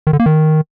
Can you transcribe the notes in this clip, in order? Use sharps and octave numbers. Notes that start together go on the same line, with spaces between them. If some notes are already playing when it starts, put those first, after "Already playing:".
D#3
D3
A#3
D#3